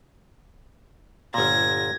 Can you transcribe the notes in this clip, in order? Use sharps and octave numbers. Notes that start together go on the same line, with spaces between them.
G1 A#2 G#6 A#6